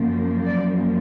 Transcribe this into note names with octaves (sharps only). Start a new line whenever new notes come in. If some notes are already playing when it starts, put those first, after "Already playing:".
Already playing: F#2 F3 A#3
D5